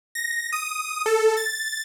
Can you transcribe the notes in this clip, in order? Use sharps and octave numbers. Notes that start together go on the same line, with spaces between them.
A#6
D#6
A4
A6